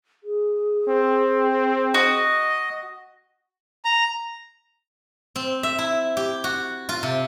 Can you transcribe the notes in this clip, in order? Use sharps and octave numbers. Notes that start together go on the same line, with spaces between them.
G#4
C4
F#4 D#5
A#5
C4
E5
E4
G4
F#4
F4
C3